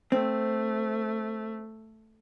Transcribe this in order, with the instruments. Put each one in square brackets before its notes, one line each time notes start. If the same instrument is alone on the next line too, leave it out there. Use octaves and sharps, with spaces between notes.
[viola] A3 [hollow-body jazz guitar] C4